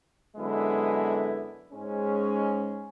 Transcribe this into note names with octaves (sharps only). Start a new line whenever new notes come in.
F#2 D3 G#3 B3 E4
G#2 G#3 C#4